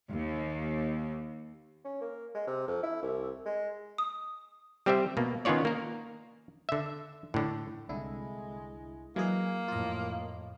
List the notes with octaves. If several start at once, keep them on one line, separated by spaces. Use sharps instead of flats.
D#2
C#4
A#3
G#3
C3
F2
E4
C2
G#3
D#6
G3 C4 G4 C5 E5
B2 A#3
D#3 B3 C#4 F4 C#5 D5
A#3 A#4
D3 E5
A2 D3
C2 D3 G#3 E4
E3 F#3 G#3 A#3 G#4
F2 A2 F4 D#5